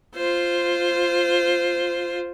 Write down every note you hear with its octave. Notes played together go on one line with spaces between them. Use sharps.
F4 C5